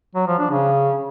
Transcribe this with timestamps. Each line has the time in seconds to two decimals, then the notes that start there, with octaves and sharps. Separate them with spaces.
0.15 F#3
0.27 F3
0.39 D4
0.51 C#3